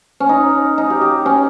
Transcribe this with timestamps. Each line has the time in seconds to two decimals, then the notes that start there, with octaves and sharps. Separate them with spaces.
0.20 C#4
0.29 D#4
0.78 D#4
0.90 G4
1.01 G4
1.26 C#4